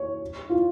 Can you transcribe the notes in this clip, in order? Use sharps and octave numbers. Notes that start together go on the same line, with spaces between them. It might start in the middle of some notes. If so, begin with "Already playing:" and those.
Already playing: C#5
F4